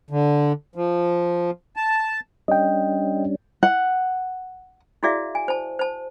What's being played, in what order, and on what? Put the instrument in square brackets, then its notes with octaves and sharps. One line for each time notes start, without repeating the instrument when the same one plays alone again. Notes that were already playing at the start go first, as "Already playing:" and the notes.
[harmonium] D3
F3
A5
[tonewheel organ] G3 C#4 D4 [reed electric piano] D#5 G5
[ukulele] F#5
[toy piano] E4 F#4 G#4 D5 E5 F5
G#5
C5 A5
C5 A5